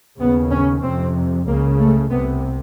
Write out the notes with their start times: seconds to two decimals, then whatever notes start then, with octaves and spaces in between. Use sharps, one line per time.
0.19 D#2 C#3 B3
0.51 C#4
0.83 F2 C3 C4
1.47 C#2 C#3 A#3
1.79 A3
2.11 C2 C3 B3